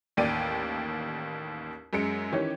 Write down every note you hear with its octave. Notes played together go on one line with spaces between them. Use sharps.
A1 D#2 D5 G5 D#7
F#2 G#3 C#7 D7
D#3 E3 C#4 G4 C#5